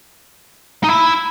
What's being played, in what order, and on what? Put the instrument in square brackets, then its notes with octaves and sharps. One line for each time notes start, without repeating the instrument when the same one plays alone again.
[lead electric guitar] D#4
E4